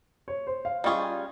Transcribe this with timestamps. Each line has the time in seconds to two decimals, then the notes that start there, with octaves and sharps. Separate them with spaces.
0.28 C#5
0.47 C5
0.65 F5
0.84 G3 C#4 F4 G#4 D#5